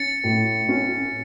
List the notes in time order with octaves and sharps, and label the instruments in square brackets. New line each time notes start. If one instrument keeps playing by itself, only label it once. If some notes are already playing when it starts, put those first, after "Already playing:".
Already playing: [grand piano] C#4 [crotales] A6 C#7
[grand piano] A2
C#4